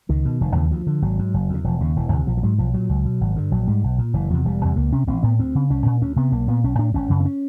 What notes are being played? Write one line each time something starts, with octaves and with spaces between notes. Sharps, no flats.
C#2 D#3
B2
F1 D#3
D#2 C#3 E3
D2 F3
D3
G#1 F#3
G#2
F#1
E2 C#3
E1 F3
D#2 C#3
E1 E3
D2 C3
A#1 F3
F3
G#2 F#3
B1 F3
A#2 F#3
C#2
B2
G#1
G2 D3
A#1 F#3
G#2 G3
B1
A#2
F#1 E3
E2 C3 F3
E1 G3
E2 C3
C#2 A#3
C3 C#4
A1 C4
A2 B3
D2 C4
C#3
C2 C#4
A#2
D2 C#4
C3 B3
B1 A#3
A#2 B3
B1 C#4
A2 D4
G#1 C#4
F#2 C#3
C4
C#4